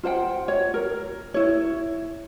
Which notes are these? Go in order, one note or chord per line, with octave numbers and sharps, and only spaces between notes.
F4 C5 F#5 G5
C#5
A#4
E4 C#5